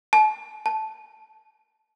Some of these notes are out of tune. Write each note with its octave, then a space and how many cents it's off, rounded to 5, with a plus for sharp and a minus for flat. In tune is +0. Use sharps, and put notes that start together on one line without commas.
A5 -40
A5 -10